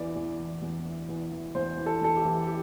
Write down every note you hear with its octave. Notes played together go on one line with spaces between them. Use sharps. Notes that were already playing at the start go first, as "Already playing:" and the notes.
Already playing: E2 E3 D5
E2
E3
E2
E3
E2
E3
E2 C5
E3
A4
E2 A4
G4
E3
G4